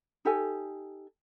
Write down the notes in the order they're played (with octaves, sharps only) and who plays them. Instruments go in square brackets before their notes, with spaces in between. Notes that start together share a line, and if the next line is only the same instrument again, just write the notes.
[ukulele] D#4 G4 A4 G#5